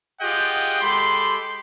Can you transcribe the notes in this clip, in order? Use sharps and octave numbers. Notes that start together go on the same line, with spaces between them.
F4 G4 G#4 D#5 F#5 G5
G#3 G4 A4 B5 C6